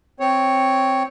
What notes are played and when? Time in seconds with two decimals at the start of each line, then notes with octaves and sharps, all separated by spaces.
0.20 C4 C#5